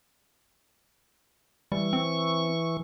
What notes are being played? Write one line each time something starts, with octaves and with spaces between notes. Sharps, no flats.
E3 G3 C#6
C4